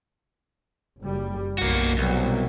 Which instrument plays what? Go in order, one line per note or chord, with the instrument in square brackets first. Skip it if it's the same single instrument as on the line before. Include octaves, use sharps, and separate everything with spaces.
[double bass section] F#1 G3
[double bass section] B1 F#2 [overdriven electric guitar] A#3 F#4
[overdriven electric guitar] C2 [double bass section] B2 F#3